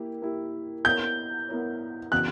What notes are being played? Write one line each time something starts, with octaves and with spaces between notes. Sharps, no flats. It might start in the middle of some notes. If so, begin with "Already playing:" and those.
Already playing: A#3 E4 G4
A#3 E4 G4
B3 E4 A#4 C#5 G6
B3 E4 A#4 C#5
C#3 E3 B3 F#4 F#6